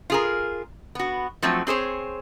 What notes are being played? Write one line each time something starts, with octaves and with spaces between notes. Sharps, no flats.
F4 G#4 A#4
B3 F#4
F3 F#3 A3 C4 F#4
C4 G#4 C5 C#5